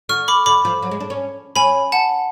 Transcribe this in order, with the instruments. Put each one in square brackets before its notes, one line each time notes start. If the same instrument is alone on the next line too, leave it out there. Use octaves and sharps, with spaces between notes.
[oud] D3 [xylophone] C#6 F6
[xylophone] B5 D6
[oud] D3 [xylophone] B5 D6
[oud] F3
F#3
G#3
D4
C#4
[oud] C#4 [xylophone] G#5 B5
[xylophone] F#5 A5